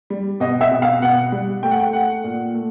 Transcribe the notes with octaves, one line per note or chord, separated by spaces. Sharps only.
G3
B2 D#5
E5
B2
F5
B2 F#5
G3
A3 G5
F#5
G5
A3 F#5
A#2
A3